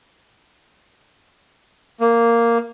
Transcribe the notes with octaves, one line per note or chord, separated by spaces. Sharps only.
A#3